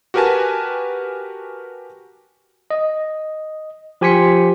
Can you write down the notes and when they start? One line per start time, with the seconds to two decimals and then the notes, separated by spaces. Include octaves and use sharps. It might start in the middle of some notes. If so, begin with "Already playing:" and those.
0.14 F#4 G4 A#4 B4 G#5 A5
2.71 D#5
4.01 F3 G4 G#5 C6 B6 C#7